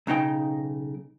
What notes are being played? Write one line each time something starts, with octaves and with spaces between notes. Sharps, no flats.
B1 C#3 D#4 G5